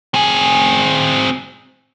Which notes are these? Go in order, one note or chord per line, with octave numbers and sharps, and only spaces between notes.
C4 G#4